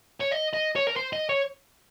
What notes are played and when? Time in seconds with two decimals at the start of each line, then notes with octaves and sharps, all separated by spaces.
0.21 C#5
0.32 D#5
0.54 D#5
0.76 C#5
0.87 A#4
0.96 C5
1.13 D#5
1.29 C#5